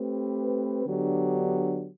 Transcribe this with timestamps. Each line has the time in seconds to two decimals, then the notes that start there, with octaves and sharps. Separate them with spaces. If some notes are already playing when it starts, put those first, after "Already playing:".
Already playing: A3 C4 G4 B4
0.86 D3 F#3 B3 D4 G4